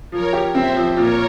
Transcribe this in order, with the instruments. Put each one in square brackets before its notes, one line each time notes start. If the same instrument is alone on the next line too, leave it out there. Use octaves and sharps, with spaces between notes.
[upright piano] F3 [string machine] A#4 C#5
[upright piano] G4
[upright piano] C4 [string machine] C5 E5
[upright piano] F3
[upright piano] A#2 [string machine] A#4 C#5